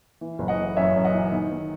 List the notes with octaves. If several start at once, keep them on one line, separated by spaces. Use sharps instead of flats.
E3
F#1
D#5 F#5
E3
F#2 C#5 E5
F#2
D#5 F#5
E3
D#3
D#3